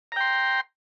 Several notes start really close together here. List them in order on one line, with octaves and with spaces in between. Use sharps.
A#5 G5 C6